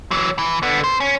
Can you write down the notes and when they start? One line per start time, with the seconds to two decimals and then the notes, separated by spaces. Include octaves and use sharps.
0.11 E3 F#3
0.39 E3
0.63 D3 B3
0.84 C5
1.00 C#4